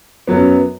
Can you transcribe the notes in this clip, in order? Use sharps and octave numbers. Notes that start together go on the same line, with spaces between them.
F#2 F#3 B3